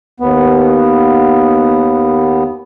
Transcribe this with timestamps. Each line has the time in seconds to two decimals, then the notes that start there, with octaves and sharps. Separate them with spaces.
0.20 D#2 B3